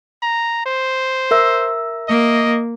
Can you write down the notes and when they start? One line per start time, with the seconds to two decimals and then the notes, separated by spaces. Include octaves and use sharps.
0.22 A#5
0.66 C5
1.31 A#4 E5 E6
2.08 A#3 D#5